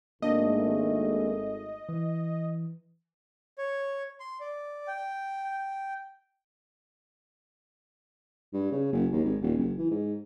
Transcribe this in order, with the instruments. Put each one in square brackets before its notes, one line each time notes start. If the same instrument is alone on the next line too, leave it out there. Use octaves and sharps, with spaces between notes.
[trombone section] G#1 A3 [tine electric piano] A#3 D4 [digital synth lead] D#5
[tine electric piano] E3
[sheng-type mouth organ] C#5
C6
D5
G5
[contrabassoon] G2
C#3
F#1
D#2
G#1
D#1
F#1
E3
G#2